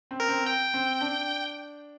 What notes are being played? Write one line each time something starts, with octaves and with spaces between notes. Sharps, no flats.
C4
A#4
C4
G5
C4
D4